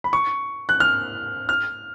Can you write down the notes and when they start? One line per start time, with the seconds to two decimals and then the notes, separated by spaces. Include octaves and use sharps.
0.04 B5
0.13 C#6
0.69 F#6
0.80 F6
1.49 F6